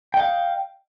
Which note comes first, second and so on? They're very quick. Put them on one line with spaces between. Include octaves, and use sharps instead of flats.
G5 D#5 F5